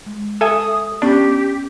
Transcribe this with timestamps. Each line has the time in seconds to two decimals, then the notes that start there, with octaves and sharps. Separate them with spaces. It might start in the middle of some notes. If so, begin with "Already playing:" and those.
0.06 G#3
0.41 A4 E5 G#5 D#6
1.02 B3 C#4 D4 G4